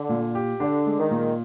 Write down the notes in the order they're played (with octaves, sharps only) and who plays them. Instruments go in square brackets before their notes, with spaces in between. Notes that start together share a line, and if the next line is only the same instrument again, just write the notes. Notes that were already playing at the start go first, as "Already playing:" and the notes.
Already playing: [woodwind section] D3
[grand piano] A#2
G4
[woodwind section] D3 [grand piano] D4
[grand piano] G#3
[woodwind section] D#3
[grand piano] A#2